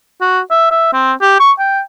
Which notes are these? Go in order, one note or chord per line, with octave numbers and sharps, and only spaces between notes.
F#4
E5
E5
C4
G4
C#6
G5